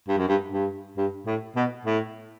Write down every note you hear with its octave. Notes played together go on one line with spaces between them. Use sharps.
G2
F#2
G2
G2
G2
A2
B2
A2